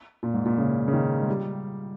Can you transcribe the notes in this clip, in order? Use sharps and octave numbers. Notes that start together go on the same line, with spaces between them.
A#2
G#2
A#2
C#3
C#3
D#3
G#3
G3